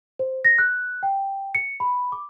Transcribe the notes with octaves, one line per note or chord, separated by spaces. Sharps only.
C5
A#6
F#6
G5
C#7
B5
D6